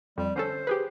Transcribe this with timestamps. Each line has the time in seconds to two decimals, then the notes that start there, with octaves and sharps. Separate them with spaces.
0.18 F2 G3
0.36 D3 C#4 A4 C5
0.67 G4 G#4 B4